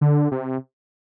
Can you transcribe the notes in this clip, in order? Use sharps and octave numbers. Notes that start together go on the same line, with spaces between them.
D3
C3